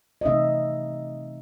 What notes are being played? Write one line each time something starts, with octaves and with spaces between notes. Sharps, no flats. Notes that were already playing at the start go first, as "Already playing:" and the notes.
D#5
C3 E3 A3 C4 D#4 E5